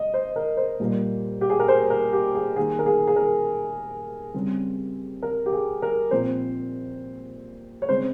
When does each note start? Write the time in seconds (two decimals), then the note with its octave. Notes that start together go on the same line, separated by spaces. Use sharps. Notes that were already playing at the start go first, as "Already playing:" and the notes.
Already playing: D#5
0.14 C5
0.36 A#4
0.57 C5
0.80 A#2 G3 A#3
1.41 G4
1.50 G#4
1.60 A#4
1.68 C5
1.90 A#4
2.13 G4
2.35 G#4
2.56 D#3 A#3 G#4
2.79 A#4
2.86 G#4
3.07 G#4
3.16 A#4
4.34 C#3 G3 C4
5.22 A#4
5.46 G4
5.53 G#4
5.82 A#4
6.11 A#2 F3 C4 C5
7.82 C#5
7.89 C#3 G#3 C4 C5